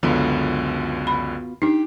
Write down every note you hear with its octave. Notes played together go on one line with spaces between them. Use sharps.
C#2 F#2 D3 B3 F4 F#4
B5
D4 D#4 G4